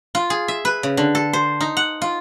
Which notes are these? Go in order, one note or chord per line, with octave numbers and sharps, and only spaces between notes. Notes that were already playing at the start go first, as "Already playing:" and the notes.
F4
G#4
E5
B4
C#3
D3
A4
C5
D#4
F#5
F4